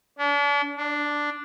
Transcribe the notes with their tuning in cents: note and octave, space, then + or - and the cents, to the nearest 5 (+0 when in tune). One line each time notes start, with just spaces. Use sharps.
D4 -40
D4 +0